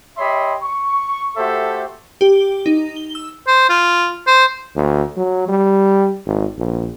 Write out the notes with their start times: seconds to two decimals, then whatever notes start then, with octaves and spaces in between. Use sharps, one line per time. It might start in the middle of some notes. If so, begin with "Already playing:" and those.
0.18 G4 C#5 D#5 E5 B5 C6
0.63 C#6
1.37 A3 F#4 G4 A4 C5 E5
2.21 G4
2.66 D#4
2.96 G7
3.15 E6
3.47 C5
3.69 F4
4.27 C5
4.76 D2
5.17 F#3
5.48 G3
6.26 G#1
6.58 A#1